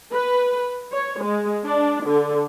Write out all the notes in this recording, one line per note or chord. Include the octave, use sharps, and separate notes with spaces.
B4
C#5
G#3
D4
D3